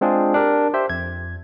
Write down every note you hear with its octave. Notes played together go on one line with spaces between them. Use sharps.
G#3 C4 D4 F4 G#4
D4 G4 A#4
G4 C5 E5
F2 G#6